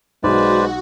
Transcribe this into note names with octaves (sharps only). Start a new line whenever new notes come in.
B1 G#3 F#4 B4 C5 D5